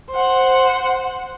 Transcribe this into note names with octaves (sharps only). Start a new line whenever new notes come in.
C5 F#5